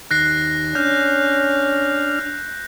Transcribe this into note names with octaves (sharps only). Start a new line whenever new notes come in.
D#2 F#6 A#6 C7
C#4 D4 F6 G6